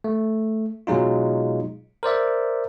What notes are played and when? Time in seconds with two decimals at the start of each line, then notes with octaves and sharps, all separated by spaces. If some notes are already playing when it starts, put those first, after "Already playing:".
0.04 A3
0.87 B2 F#3 G#3 D#4 F4
2.03 A#4 C5 D5 E5